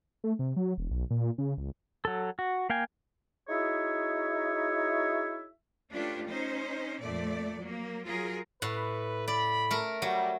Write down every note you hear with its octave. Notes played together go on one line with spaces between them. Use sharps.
A3
C3
F#3
E1
B1
A#2
C#3
C#2
F#3 A4
F#4
A#3 F5 G5 G#5
D#4 E4 F#4 G#4 C#5 E5
A3 C#4 D4 F4 G4 B4
C#4 D#4 C5
F2 A#2 A3 D5
F#3 A#3
F#3 F4 G#4 A#4
A2 B4
D5 B5
A3 A#4
F#3 G3